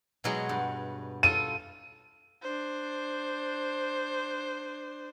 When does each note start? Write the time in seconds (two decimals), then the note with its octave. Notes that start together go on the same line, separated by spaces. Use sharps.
0.24 B2 F#3 G#3
0.49 G2
1.23 F4 A4 D#7
2.42 D4 C5